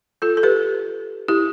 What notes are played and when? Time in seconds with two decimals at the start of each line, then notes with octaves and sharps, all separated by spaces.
0.22 F4 A4
0.37 A4
0.43 G4 B4
1.28 E4 G4